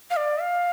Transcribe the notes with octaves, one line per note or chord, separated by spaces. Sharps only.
F5
D5
F5